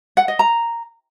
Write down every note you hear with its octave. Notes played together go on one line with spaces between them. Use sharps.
F#5
D#5
A#5